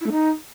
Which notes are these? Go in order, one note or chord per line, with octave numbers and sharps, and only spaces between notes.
E4
A3
D#4